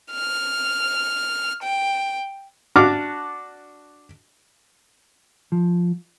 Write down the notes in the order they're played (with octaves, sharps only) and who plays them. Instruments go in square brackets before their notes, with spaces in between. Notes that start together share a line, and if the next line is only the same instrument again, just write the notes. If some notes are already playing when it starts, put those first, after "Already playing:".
[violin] F6
G5
[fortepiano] D4 F#4 A5 D6 F6
[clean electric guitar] F3